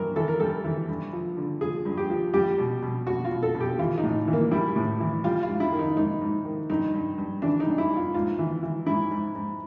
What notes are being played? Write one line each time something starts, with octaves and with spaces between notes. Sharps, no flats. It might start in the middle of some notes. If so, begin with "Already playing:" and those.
Already playing: G2 E3 A#4
E3 A4
A#4
G3 A4
E3
G2
F3
D3
F3 G#4
G2
G4
F3
G3 G4
B2
B2
B2 F#4
F4
B2
A4
B2
G4
E3 F4
D#4
A2
E3
A#3
G3 E4
A2
E3
G3 F4
F4
G#2
E4
D#3
D#4
G#2 D#4
G#2
D#3
G2 D#4
G2
G2
E3 D4
D#4
G2
E4
G2
F4
G#2 F4
E3
E3
G#2 E4
G#2
G#2